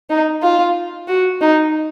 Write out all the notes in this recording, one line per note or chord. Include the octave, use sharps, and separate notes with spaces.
D#4
F4
F#4
D#4